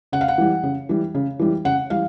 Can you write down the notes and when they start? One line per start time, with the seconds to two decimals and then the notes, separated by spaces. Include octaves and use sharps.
0.12 C#3 F#5
0.21 F5
0.28 F#5
0.38 E3 G3
0.63 C#3
0.89 E3 G3
1.15 C#3
1.39 E3 G3
1.65 C#3 F#5
1.90 E3 G3 F5